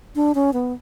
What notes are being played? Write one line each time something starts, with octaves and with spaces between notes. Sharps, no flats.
D4
C#4
B3